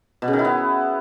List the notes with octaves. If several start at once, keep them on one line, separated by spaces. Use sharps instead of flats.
B2
C#3
D#3
E4
B3